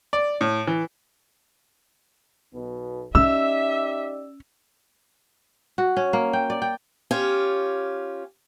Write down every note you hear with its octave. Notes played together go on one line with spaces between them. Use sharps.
D5
A2
E3
B1 B2
C#4 D#4 G4 D5 E5 E6
F#4
C#4
A#3
G5
D5
G5
C#4 F4 G4